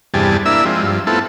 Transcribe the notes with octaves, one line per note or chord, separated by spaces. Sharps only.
E2 G2 C3 G3 G#4 A5
A#3 D4 E4 E5 E6
F3 G#3 C4
G2 F3
A3 B3 C4 E4 F4 A4